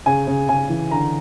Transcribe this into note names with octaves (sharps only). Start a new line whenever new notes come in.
C#3 G#5
C#3
C#3 G#5
E3
D3 A#5